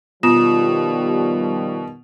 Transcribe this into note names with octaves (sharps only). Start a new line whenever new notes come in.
B2 D#3 F3 G3 F4 D#6 E7